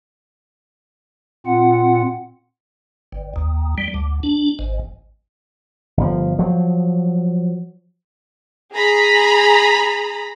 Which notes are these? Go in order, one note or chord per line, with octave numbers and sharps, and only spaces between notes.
A#2 C4 F4 F#5
G1
D#2
G3
D2
D4
G#1
G1 F3
F3 F#3
G#4 A#5 B5